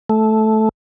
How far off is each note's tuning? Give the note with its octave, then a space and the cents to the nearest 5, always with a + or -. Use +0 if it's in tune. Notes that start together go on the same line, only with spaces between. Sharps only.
A3 -10